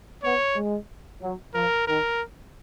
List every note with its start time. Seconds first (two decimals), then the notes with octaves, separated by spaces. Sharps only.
0.23 B3 C#5
0.56 G#3
1.21 F#3
1.54 F3 A#4
1.87 D#3 A#4